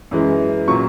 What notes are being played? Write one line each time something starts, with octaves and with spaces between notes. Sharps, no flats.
F#2 E3 G#3
A#2 F#3 C#6